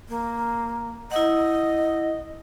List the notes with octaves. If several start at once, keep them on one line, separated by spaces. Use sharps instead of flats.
A#3
E4 D#5 F#5